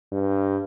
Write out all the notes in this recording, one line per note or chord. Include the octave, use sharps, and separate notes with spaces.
G2